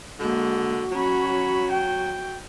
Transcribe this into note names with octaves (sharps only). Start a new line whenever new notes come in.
D3 G#3 A#3 F#4
F#3 C#4 B5
G5